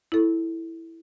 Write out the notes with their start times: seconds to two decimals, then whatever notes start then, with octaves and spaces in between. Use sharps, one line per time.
0.12 E4 A4